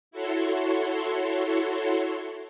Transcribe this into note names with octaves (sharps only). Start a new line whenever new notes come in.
E4 F#4 A4 C#5 C6